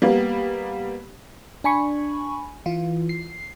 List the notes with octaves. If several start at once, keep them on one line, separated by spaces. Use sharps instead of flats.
G3 A#3 B3
D4 G#5 B5 C#6
E3 F4
C7